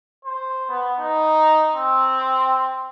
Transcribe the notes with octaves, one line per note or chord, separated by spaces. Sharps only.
C5
B3
D#4
C4